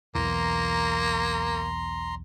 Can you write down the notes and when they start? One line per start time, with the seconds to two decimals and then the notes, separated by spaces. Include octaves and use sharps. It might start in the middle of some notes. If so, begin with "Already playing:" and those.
0.15 B1 E2 E3 A#3 A#5 C6